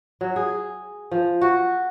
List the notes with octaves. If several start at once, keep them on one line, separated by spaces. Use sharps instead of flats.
F#3
G#4
F3
F#4